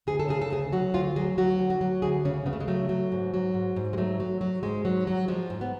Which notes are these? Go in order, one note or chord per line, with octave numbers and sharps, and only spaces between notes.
D2 G#4
A4
C#3 G#4
A4
D2 G#4
F#3 F#4
D2 F4
F#3 G#4
F#3 F#4
D2
F#4
F#3
D2 G#4
C#3 C#4
C#3 B3
A3
G#3
F#3 A3
F#3
G#2
F#3
G#2
G#2
G#3
F#3 A3
F#3
F#3
G#2 G#3
F#3
F#3
F3 G#3
G#2
B3